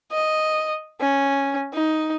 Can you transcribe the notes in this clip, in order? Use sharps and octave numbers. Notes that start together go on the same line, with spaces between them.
D#5
C#4
D#4